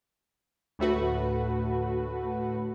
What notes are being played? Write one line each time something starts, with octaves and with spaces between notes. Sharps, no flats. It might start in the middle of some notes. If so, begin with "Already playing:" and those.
D2 A2 A3 F#4 B4